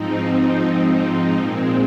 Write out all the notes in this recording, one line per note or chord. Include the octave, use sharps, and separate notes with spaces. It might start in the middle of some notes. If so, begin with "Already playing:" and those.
Already playing: G#2 F3 C4 D#4
A#2 G#3 C4